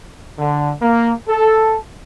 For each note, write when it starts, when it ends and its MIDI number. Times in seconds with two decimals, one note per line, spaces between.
0.38 0.73 50
0.81 1.12 58
1.28 1.76 69